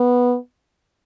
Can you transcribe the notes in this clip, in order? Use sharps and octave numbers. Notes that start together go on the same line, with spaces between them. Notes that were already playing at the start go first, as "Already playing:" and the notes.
Already playing: B3